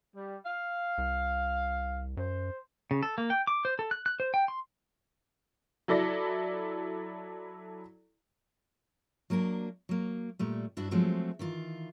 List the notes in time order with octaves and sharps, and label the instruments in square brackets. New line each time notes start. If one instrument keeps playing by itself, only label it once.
[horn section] G3
F5
[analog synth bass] C2
[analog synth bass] F#2 [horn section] C5
[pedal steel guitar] C#3
A4
A#3
G5
D6
C5
A4
F#6
F#6
C5
G5
C6
[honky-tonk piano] F#3 E4 A4 D5 A#6
[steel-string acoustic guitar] F#3 A#3 D4 A#4
F#3 A#3
A#2 G3 A3
G2 D4 E4 F#4
F3 F#3 G#3 A3 C4 F#4
D#3 E3 F4